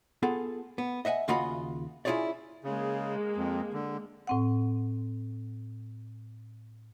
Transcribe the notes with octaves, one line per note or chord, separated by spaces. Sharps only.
B3 F4 G#4 A4
B3
D#5 E5 F#5 G#5
D#2 C#3 F4 F#4 D#5 B5
C#4 E4 F4 G#4 C#5 D5
C#3 G#3 A#3
F2
D3
A2 C4 F#5